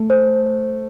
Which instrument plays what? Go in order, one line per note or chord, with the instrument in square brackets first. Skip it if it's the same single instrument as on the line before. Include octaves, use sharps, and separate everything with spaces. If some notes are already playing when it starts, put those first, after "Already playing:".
Already playing: [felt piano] A3
[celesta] C5
C5